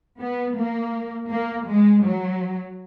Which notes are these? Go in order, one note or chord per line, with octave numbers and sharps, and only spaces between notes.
B3
A#3
A#3
G#3
F#3